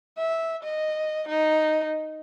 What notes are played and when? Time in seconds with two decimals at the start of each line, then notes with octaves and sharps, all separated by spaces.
0.18 E5
0.63 D#5
1.29 D#4